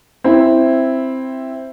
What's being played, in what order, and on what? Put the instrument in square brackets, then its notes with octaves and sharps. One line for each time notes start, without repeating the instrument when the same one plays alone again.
[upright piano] C4 E4